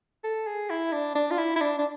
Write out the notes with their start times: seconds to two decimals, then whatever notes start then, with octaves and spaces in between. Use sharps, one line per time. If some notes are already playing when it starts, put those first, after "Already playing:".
0.24 A4
0.47 G#4
0.70 E4
0.93 D4
1.15 D4
1.31 F4
1.38 E4
1.56 E4
1.61 D4
1.79 D4